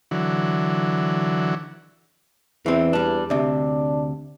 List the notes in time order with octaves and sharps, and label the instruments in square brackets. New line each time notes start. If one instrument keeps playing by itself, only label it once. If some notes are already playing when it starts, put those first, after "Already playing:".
[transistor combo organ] D3 E3 F#3
[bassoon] E2 [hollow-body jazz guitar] E3 C4
[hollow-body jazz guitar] G3 D4
[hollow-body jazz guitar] D2 C3 [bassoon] D4